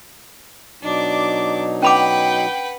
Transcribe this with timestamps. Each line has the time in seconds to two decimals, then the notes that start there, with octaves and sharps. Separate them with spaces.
0.83 B2 F#3 D4 D#4 D6
1.82 C#4 B4 F#5 G5 B5 D6